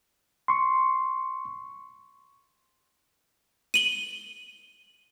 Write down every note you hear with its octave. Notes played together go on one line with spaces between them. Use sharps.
C6 C#6
D#7 F#7 G7